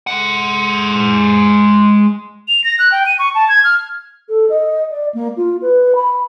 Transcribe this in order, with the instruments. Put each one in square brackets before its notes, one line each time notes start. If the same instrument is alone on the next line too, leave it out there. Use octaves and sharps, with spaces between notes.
[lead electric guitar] G#3 F#5
[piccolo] F7
A#6
F#6
G5
D#7
C#6
A5
G#6
F6
[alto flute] A4
D#5
D5
A#3
F4
B4
B5